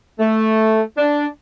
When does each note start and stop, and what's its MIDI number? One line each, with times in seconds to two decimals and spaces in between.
0.20 0.81 57
0.97 1.26 62